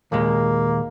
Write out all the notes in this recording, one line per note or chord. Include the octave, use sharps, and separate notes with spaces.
D#2 A#2 G#3 A#3